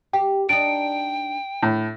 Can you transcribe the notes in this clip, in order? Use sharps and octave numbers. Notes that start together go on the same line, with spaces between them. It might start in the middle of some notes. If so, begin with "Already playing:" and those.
G4 G5
D4 D#4 G5 D7
A2